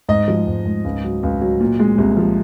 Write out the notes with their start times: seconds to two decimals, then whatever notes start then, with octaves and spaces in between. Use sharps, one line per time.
0.09 G#2 D#5
0.28 F3
0.47 G#2
0.66 G#2
0.84 C#2
1.04 F#3
1.23 C#2
1.41 F#3
1.60 A#2
1.79 G#3
1.98 C2
2.17 F3